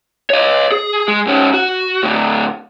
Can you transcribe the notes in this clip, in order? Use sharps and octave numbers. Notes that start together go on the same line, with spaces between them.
C#5 D#5
G#4
G#3
G#2 C#4
F#4
A2 D3